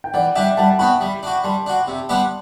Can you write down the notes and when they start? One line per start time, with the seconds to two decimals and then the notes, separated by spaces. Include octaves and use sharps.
0.04 G5
0.14 E3 D5 F#5
0.36 G3 D4 G4 E5 G5
0.57 G3 F#5 A5
0.70 A5
0.79 B3 F#4 G5 B5
1.01 G3
1.23 D4 F#4
1.44 G3 A5 C6
1.66 D4 F#4
1.88 C3
2.09 G3 B3 D4 G4